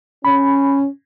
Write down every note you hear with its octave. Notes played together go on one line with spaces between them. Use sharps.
C#4 B5